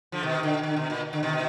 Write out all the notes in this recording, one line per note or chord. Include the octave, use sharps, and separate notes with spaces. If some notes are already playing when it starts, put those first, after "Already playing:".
D3 F3
B2 D#3
D3
D3
B2
A#2
D3
B2 D#3
B2